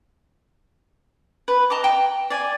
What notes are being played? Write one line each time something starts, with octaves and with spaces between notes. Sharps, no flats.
B4
D#5 A5 A#5 D6
G5
D5 G#5